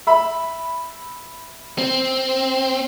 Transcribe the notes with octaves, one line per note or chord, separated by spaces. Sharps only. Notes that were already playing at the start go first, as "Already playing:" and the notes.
E5 B5
C4